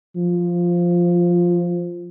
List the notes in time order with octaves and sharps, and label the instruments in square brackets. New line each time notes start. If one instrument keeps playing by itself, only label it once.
[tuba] F3